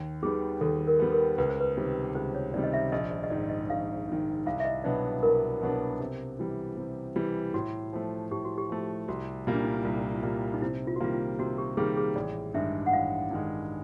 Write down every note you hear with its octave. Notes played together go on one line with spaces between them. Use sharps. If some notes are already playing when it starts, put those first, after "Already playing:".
Already playing: D#2
D#3 G3 B3 G#4
D#2 A4
A#4
D#3 G3 B3
A#4
C#2 B4
C5
B4
C3 D#3 G3
C#2 C5
C#5
C3 D#3 G3 D5
D#5
E5
A#1 D#5
D5
D#5
G#2 D#3 D5
D#5
A#1 F5
G#2 D#3
C2 F5
E5
D#5
B2 F#3 B3 D4 D5
C2 A#4
B2 F#3 B3 D4
C3
E3 G3
C3
E3 G3
A2 F#4
F3 A3
A2 G4
F#4
G4
F3 A3
C2 F#4
A#2 G3 A#3
D4
D#4
E4
C2 F4
A#2 G3 A#3
D#4
C3 E4
F4
F#4
D#3 G3 A#3 F4
F4
C3 F#4
G4
D#3 G3 A#3 G#4
G#4
A1 D5
G2 D#3 G#3 E5
F#5
A1 F5
G2 D#3 G#3